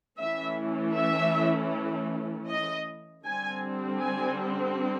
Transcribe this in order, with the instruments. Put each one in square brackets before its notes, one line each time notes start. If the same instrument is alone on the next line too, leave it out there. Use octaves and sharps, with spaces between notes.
[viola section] E3 A3 C#4 E5
E5
D#5
D3 G3 C4 G#5
G#5